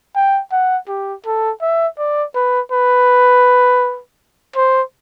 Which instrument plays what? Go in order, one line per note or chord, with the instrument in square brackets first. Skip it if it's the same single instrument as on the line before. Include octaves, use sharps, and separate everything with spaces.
[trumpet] G5
F#5
G4
A4
E5
D5
B4
B4
C5